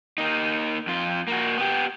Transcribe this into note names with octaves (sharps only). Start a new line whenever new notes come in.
A#3 D#4
F2 F4
A#3 F#4
B3 G4